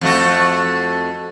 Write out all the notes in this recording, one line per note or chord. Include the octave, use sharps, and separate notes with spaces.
F2 A3 F#4